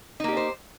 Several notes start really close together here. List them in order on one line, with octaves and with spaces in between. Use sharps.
D#4 A#3 G4 D4 C5